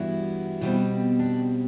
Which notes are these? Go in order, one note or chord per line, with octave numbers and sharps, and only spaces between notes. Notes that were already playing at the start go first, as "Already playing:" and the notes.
Already playing: G2 E3 G3 B3 D4 E4 F#4
B2 G3 C4
D4